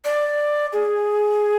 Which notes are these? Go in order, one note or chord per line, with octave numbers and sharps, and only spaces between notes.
D5
G#4